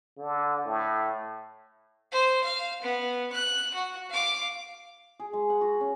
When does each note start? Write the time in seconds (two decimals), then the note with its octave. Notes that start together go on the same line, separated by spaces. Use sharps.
0.18 D3
0.65 A2
2.12 C5
2.44 F5
2.82 B3
3.32 F#6
3.74 F#4
4.10 F5 D6
5.20 G#4
5.33 G#3
5.50 F#5
5.61 F#4
5.81 C#4